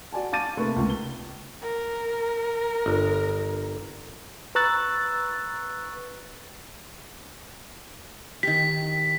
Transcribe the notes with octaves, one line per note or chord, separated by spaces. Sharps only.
F#4 D5 G#5 A5
F5 A5 D6 A6 D#7
C3 A3 A#3 D#4 B4 C#6
C#2
G7
A#4
G1
B4 A#5 C#6 E6 F#6 A6
D#3 G4 B6